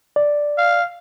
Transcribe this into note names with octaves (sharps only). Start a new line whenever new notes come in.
D5
F5